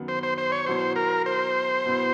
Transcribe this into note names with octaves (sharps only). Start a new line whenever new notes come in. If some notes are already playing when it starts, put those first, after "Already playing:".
Already playing: F#2 D#3 F#3 B3
C5
C5
C5
C#5
B2 F#3 B3 E4 C5
A#4
C5
B2 F#3 B3 E4